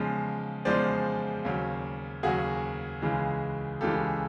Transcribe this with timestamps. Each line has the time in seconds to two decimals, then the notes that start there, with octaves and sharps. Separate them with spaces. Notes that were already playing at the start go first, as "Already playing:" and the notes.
Already playing: E2 C#3 F3 G#3
0.65 E2 C#3 F3 G#3 C5 D5
1.45 D#2 C#3 F#3
2.23 D#2 C#3 F#3 F#4 G#4
3.02 C#2 C#3 E3 G#3
3.81 C#2 C#3 E3 G#3 G4 A4